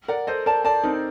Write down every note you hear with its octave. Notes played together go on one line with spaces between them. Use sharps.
A#4 D5 F#5
A4 C5 D#5
A#4 D5 A5
A#4 D5 A5
C4 D#4 A#4